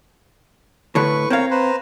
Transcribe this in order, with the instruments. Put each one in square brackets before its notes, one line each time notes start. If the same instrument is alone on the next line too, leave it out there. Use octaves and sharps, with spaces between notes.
[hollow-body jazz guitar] A2 D3 [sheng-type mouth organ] B4 C#6
[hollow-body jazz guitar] C4 F5 [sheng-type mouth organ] A#4 C#5
[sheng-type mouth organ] B4 C5 A#5